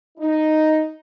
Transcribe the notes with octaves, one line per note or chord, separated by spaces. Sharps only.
D#4